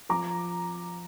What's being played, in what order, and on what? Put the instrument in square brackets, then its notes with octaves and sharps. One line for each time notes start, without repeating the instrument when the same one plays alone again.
[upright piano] F3 A#5 D6